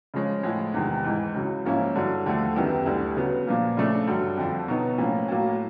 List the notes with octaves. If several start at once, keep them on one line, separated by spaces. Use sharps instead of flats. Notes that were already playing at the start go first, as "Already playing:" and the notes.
C#3 F3 G#3 C#4
A2 F3 G#3
E2 C3 D#3 G#3
G#2 E3 G#3
C#2 C#3 F#3
G#2 F3 A#3 C#4 E4
G2 D3 F#3
D#2 D3 F3 A3
F#2 D#3 G3 B3 E4
D2 D3 G3
C#3 F#3 B3
A#2 F3 A#3
C#3 F3 A3 D4
G2 D3 F#3
F2 D3 F3
B2 F#3 B3 D#4
A2 F3 A#3 C#4
A2 F#3 A#3